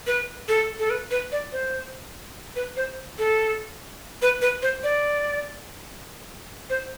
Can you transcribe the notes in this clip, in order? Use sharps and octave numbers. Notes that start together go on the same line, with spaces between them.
B4
A4
A4
B4
B4
D5
C5
B4
C5
A4
B4
B4
C5
D5
C5